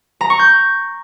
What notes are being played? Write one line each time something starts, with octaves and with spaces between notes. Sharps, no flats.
A#5
C#6
G6